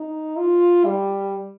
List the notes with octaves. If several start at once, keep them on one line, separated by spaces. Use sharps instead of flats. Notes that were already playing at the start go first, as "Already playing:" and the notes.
Already playing: D#4
F4
G3